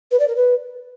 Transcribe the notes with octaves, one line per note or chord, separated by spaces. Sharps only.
B4
D5
A#4
B4